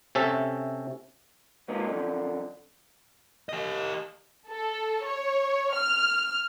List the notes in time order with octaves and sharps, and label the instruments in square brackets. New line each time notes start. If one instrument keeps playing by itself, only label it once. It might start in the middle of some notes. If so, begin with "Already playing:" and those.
[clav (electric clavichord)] C3 C#4 A4 E5
[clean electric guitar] G#2 A#3 D#4 [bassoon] B2
[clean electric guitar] F#2 F3 [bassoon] D3
[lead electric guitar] G4 D#5
[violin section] A4
C#5
F6